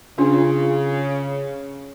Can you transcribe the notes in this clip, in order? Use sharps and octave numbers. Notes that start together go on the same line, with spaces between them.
C#3 C#4 D4 F4